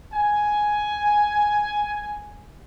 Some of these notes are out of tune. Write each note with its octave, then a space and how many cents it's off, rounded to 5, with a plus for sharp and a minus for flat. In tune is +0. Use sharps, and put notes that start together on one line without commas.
G#5 +5